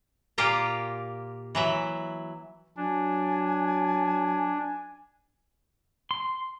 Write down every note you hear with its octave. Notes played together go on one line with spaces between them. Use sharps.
A#2 A#3 F4 G4 F5 A#5
E3 F#3 E5
F#3 D4 G#5
C6